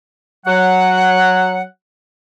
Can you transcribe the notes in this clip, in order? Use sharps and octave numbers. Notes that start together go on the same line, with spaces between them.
F#3 F#5